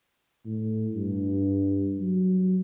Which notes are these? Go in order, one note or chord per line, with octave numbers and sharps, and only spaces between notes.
A2
G2
F#3